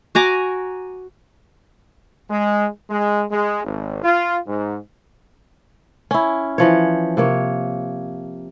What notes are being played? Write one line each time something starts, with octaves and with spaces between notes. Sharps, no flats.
F#4 G#5 A#5 D6
G#3
G#3
G#3
G#1
F4
G#2
C#4 E4
E3 F3 C#5
C3 A#3 C#5